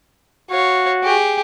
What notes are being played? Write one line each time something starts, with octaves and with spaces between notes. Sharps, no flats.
F#4 C#5 F5
G4 G#4